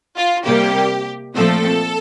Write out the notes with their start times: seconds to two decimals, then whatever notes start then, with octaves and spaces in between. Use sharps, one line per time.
0.16 F4
0.45 C3 G3 A#3 G4
1.35 A#2 F3 A3 C4 A4